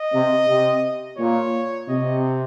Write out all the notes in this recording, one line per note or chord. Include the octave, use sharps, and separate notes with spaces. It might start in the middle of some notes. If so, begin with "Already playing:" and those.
Already playing: D#5
C3
C3
A#2 C#5
C3 D#5